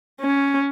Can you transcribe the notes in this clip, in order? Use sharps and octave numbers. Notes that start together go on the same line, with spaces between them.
C#4